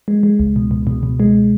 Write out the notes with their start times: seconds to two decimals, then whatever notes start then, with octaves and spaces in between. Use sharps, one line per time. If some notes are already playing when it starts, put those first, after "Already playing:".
0.08 G#3
0.23 G#3
0.40 C#2
0.56 B2
0.71 B2
0.87 B2
1.03 B2
1.20 G#3